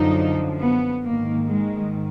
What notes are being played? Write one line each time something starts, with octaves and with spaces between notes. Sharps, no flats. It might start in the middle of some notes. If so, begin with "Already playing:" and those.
Already playing: F#2 D3 F3 D#4
B3
G#2 D#3 A#3
G#3